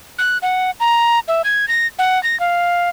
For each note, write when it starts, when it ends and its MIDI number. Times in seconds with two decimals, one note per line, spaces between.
0.18 0.38 90
0.42 0.71 78
0.80 1.19 82
1.28 1.42 76
1.44 1.68 92
1.68 1.87 94
1.99 2.21 78
2.23 2.38 94
2.40 2.89 77